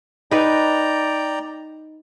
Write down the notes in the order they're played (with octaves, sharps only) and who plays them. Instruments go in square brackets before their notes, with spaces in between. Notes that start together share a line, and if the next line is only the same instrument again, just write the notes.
[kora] D#4 B4 [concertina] D5 G5 A#5